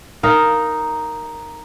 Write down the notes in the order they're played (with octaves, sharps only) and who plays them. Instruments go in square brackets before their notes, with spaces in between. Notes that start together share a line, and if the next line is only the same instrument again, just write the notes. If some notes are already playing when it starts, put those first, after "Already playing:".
[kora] D#4 A#4 F5